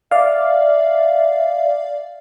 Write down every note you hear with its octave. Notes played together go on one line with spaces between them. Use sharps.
D5 E5 F5